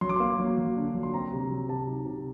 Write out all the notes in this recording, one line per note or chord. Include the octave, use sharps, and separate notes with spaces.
F#3 C6
D6
A#3 C6
F#3
F#3
D3
F#3
C6
C4 A#5
C3
F#3
C3 A5
D#4
C3